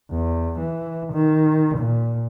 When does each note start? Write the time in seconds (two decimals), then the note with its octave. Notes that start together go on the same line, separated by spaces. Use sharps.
0.11 E2
0.59 E3
1.13 D#3
1.78 A#2